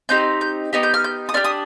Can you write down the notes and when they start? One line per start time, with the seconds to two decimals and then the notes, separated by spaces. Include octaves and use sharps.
0.09 C4 D#4 G4 G6
0.41 G6
0.73 B3 D#4 G4
0.83 G6
0.94 F6
1.04 G6
1.29 D#6
1.34 D4 G4 F6
1.44 D#6